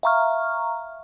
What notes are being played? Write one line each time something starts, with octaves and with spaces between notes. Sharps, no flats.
E5 F5 A#5 C#6 F6